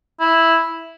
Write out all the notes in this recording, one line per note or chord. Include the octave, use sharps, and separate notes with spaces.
E4